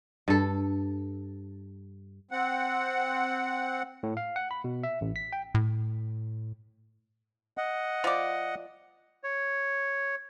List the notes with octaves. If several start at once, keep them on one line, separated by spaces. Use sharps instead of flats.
G2 A4
C4 F#5
A2
F5
F#5
B5
B2
E5
A1
B6
G5
A2
D#5 F#5
F3 D5
C#5